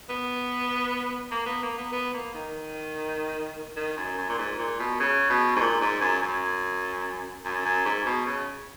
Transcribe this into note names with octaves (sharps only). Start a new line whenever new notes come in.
B3
A#3
B3
A#3
B3
B3
A#3
D#3
D#3
F#2
F#2
A#2
G#2
A#2
B2
C#3
B2
G#2
A#2
G#2
F#2
F#2
F#2
F#2
G#2
B2
C#3